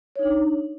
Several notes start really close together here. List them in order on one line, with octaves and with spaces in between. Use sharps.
C#5 D#4 D4